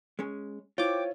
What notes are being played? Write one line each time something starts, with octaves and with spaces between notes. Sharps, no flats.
G#3 C#4
E4 F4 C5 C#5 E5 G5 D6